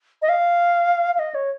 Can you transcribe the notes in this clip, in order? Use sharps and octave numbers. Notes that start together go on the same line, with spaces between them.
D#5
F5
F5
D#5
C#5